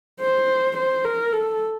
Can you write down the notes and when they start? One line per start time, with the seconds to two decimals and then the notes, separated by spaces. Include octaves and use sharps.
0.21 C5
0.77 C5
1.05 A#4
1.33 A4